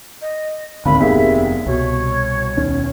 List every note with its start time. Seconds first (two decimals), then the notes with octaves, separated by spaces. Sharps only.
0.22 D#5
0.86 G#1 C#2 D3 B5
1.00 F1 D#2 B3 C4 G4 G#4 E5
1.66 C2 B2 C#5
2.57 D#2 B2 C#4